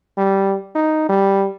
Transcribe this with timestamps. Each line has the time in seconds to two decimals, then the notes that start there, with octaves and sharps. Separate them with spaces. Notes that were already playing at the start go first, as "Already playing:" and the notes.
0.17 G3
0.75 D#4
1.09 G3